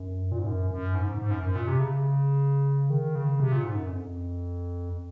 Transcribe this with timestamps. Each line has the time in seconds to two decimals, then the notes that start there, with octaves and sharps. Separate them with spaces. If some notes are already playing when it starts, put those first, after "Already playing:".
Already playing: F#2
0.32 A#2
0.39 G#2
0.46 F#2
0.71 F#2
0.95 G#2
1.07 G#2
1.19 G#2
1.31 F#2
1.43 F#2
1.55 A#2
1.68 C3
1.80 C#3
2.90 D#3
3.15 C#3
3.40 C3
3.52 A#2
3.64 G#2
3.76 F#2
3.88 F2